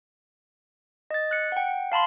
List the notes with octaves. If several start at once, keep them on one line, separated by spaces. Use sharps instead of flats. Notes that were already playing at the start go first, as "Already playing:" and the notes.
D#5 A6
F#6 C#7
F#5 G5
F5 A5 B5 C6